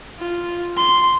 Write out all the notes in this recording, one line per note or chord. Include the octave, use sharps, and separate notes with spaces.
F4
C6